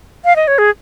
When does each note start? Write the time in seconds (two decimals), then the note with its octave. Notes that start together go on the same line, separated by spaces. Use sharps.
0.25 F5
0.36 D#5
0.48 C#5
0.58 G#4